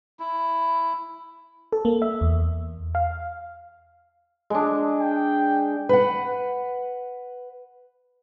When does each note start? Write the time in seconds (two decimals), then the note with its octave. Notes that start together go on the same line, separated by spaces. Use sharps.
0.20 E4
1.72 A4
1.85 A#3
2.02 E5
2.21 E2
2.95 F5
4.50 G#3 D4
5.00 G5
5.89 B4 F#5